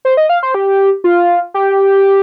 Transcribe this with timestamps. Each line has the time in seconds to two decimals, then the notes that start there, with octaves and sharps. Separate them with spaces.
0.05 C5
0.17 D#5
0.29 F5
0.43 C5
0.55 G4
1.04 F4
1.54 G4